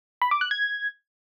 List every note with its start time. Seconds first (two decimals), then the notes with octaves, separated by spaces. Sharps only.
0.22 B5
0.31 D6
0.41 F#6
0.51 G#6